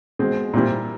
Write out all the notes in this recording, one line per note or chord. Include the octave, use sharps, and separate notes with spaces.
B2 G#3 C4
A#2 G3 C4 E4